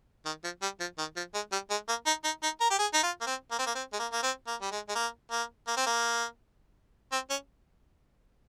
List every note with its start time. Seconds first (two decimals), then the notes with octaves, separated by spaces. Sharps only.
0.26 D#3
0.44 F3
0.62 G3
0.80 F3
0.98 D#3
1.16 F3
1.34 G#3
1.52 G3
1.70 G#3
1.89 A#3
2.06 D#4
2.24 D#4
2.43 D#4
2.61 A#4
2.70 G4
2.79 G#4
2.94 D#4
3.03 F4
3.21 A#3
3.27 C4
3.51 A#3
3.59 C4
3.67 A#3
3.75 C4
3.93 G#3
3.99 A#3
4.12 A#3
4.23 C4
4.47 A#3
4.62 G3
4.71 G#3
4.89 G#3
4.95 A#3
5.31 A#3
5.68 A#3
5.77 C4
5.86 A#3
7.12 C4
7.30 C#4